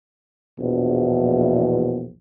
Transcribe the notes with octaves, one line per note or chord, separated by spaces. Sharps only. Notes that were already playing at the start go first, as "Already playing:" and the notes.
A#1 E2 B2